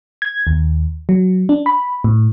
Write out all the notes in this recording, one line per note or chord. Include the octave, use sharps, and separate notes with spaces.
G#6
D#2
F#3
D4
B5
A2